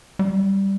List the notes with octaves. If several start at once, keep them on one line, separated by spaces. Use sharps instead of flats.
G3